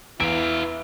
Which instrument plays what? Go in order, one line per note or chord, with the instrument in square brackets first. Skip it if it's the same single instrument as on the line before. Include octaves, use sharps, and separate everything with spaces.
[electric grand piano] E2 [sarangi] E3 [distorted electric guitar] E4 F5 [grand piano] D7